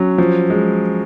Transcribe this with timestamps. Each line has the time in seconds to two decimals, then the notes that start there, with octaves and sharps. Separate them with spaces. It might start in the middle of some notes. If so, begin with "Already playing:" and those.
Already playing: F#3 C#4
0.18 F3
0.50 G#3